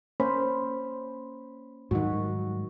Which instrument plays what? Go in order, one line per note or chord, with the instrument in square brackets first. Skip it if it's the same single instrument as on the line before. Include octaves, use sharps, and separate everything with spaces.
[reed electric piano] A#3 C#4 B5 [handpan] C5
[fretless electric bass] G#2 F#3 G3 [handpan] D#3 F#4